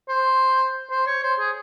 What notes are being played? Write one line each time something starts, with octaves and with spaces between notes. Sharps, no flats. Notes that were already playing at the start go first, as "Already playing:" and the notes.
C5
C5
C#5
C5
G#4